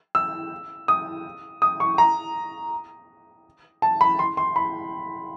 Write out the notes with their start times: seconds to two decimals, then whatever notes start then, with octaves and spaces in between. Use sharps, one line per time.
0.15 E6
0.88 D#6
1.62 D#6
1.80 C#6
1.98 A#5
3.82 A5
4.01 B5
4.19 C6
4.37 C6
4.56 B5